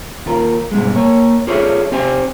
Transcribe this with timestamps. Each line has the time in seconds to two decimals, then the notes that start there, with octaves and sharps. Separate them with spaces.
0.26 D#2 F4 A#4
0.71 G2 B2 G#3
0.94 A#3 C#5
1.47 F4 G#4 A4 C#5 D5 E5
1.92 C4 G4 C5 G5 G#5